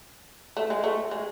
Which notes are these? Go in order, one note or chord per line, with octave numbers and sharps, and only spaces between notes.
A3
G#3
A3
G#3